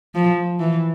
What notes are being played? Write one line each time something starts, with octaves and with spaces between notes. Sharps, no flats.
F3
E3